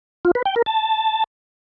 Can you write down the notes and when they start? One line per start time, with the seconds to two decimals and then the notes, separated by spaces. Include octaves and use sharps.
0.25 F4
0.35 B4
0.45 G5
0.56 A#4
0.66 A5